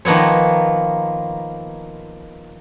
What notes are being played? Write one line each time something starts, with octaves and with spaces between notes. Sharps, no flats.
D#3 F3 A#3 B3 C#5